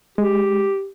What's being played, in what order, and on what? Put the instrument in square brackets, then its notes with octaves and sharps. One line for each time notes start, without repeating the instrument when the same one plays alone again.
[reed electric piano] G#3 [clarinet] G4